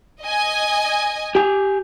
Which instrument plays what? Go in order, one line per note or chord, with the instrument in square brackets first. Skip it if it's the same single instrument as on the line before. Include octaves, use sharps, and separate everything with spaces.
[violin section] D#5 G#5
[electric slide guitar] G4 G#5